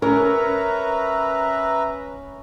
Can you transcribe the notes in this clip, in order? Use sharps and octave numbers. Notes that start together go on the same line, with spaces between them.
C#4 A#4 B4 E5 A#5